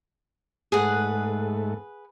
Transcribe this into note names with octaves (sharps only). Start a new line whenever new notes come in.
G#2 A3 G#4 B4 F#5